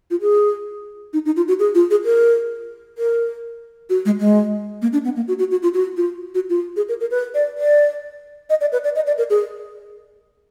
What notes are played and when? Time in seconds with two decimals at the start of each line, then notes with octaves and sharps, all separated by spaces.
0.11 F4
0.21 G#4
1.13 D#4
1.26 D#4
1.36 F4
1.48 F#4
1.59 G#4
1.75 F4
1.91 G#4
2.05 A#4
2.98 A#4
3.90 F#4
4.05 G#3
4.20 G#3
4.82 A#3
4.93 D4
5.05 B3
5.16 A#3
5.28 F#4
5.39 F#4
5.51 F#4
5.63 F4
5.74 F#4
5.97 F4
6.35 F#4
6.50 F4
6.76 G#4
6.89 A#4
7.01 A#4
7.11 B4
7.34 D5
7.58 D5
8.50 D#5
8.61 D5
8.72 B4
8.84 D5
8.96 D#5
9.07 D5
9.18 A#4
9.30 G#4